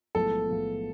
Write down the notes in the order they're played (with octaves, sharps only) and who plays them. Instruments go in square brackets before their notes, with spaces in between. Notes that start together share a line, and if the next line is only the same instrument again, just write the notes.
[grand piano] B1 A2 F3 G#3 B3 [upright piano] A4
[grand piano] B1 A2 F3 G#3 B3